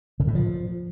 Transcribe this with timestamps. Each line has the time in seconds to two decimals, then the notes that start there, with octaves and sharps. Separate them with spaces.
0.20 C#3
0.27 A2
0.35 F3